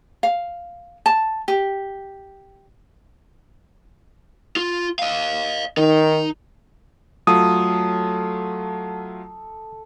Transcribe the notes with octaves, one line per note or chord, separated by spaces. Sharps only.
F5
A5
G4
F4
D#5 F5
D#3 D#4
F#3 A3 F4 A4 D#6